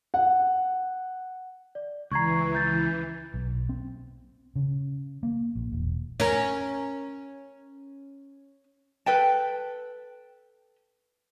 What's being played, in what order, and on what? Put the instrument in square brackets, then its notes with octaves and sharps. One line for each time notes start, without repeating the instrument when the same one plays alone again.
[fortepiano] F#5
[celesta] D5
[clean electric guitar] C#2 A#5 [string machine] E3 [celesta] C#6 G#6 C7
[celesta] G6 A6
[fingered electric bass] B1
C4
C#3
A#3
A#1
E1
[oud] C#4 A#4
[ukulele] A4 B4 G5 A5